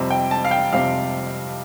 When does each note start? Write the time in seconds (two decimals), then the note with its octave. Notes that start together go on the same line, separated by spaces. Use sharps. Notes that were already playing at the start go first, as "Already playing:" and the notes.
Already playing: F2 C3 G3 C4
0.10 G5
0.31 A5
0.45 F5
0.51 G5
0.72 F2 C3 G3 C4 F5